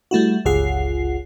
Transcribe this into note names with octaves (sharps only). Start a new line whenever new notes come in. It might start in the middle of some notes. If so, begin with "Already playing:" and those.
G3 A3 E4 F#4
G1 C#2 F4 G#4 F#5 C7